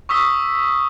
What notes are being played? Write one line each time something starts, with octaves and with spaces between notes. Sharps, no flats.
C#6 D#6 E6 B6 G7